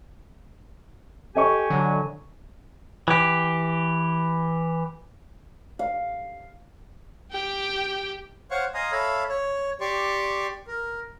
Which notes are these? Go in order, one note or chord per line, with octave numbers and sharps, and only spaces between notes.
G4 A4 D#5 G#5 C#6
D3 F#3
E3 G4
F5
G4 G5
C5 C#5 F5 F#5 C6 C#6
D#5 F5 G#5 A#5 C6 D#6
A4 C#5 E5 F5 B5
C#5
G4 D5 C6 C#6
A#4